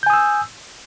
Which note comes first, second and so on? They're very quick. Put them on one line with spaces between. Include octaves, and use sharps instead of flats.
G6 G#5 D#6 E6